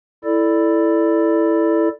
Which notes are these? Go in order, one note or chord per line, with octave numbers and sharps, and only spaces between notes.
E4 A4 D5